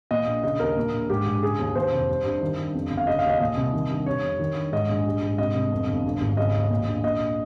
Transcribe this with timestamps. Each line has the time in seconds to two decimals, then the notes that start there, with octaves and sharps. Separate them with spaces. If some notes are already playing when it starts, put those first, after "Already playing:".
0.11 A#2 D#5
0.27 A#1
0.43 C#3 D#5
0.60 D#2 A#4
0.77 A#2
0.93 A#1
1.10 G#2 G4
1.26 A#1
1.42 C#3 G#4
1.59 D#2
1.75 D#2 C5
1.92 F1
2.09 G3
2.25 G2
2.41 D#3
2.58 G2
2.74 F2
2.91 G1
2.97 F5
3.07 C#3 D#5
3.19 F5
3.24 D#2
3.29 D#5
3.40 A#2 D#5
3.57 C2
3.73 D#3
3.91 G2
4.06 C3 C#5
4.23 F2
4.39 D#3
4.56 G2
4.72 G#2 D#5
4.89 A#1
5.05 G3
5.23 G#2
5.38 C3 D#5
5.55 C2
5.72 F2
5.88 G1
6.05 G2
6.21 G#1
6.37 C#3 D#5
6.54 D#2
6.71 A#2
6.87 A#1
7.04 A#2 D#5